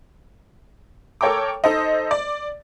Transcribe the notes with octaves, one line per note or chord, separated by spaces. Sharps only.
A4 A#4 C#5 G5 A#5 D6
D#4 A4 C5 D#5
D5